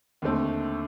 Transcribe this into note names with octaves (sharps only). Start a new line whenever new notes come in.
D#2 D3 A3 C4